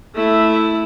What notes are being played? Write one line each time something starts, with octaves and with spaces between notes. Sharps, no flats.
A3 E4